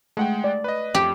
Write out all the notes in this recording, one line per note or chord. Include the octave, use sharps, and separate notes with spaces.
G#3 A3 F#5 G5
D5
B4 D#5
F2 G4